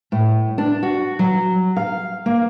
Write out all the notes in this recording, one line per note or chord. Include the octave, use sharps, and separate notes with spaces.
A2
D4
F#4
F#3
F5
A#3